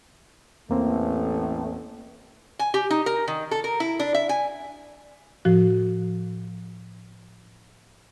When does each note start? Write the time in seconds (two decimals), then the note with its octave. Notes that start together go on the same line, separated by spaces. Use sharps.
0.69 A1 E2 A3 A#3 C4
2.59 G#5
2.74 G4
2.90 D#4
3.06 A#4
3.28 D#3
3.51 A4
3.64 A#4
3.80 E4
3.99 D4
4.14 E5
4.29 G#5
5.45 A2 F3 F#4